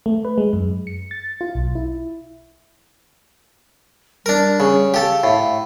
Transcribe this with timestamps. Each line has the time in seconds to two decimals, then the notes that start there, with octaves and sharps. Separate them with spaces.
0.06 A3
0.25 B4
0.38 G#3
0.53 F#2
0.87 C#7
1.11 A6
1.41 F4
1.55 B1
1.75 E4
4.26 G3 D4 A#4
4.60 C#3
4.94 G4 A4 F5
5.24 A2